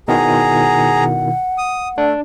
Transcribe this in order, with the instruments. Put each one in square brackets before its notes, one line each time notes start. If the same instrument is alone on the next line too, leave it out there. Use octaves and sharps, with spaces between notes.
[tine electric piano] B2 D#3 E4 [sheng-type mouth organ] G#4 A#5 [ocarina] F#5
[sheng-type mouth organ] D#6
[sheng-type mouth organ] A3 [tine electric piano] D4